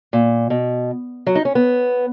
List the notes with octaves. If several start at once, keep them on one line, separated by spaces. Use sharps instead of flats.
A#2
B2
F#3
D#4
C#4
B3